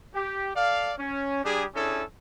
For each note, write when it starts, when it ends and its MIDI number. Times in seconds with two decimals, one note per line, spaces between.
0.15 0.51 67
0.56 0.93 69
0.56 0.93 74
0.56 0.93 77
0.98 1.42 61
1.45 1.65 55
1.45 1.65 62
1.45 1.65 67
1.45 1.65 68
1.75 2.03 61
1.75 2.03 62
1.75 2.03 64
1.75 2.03 68
1.75 2.03 69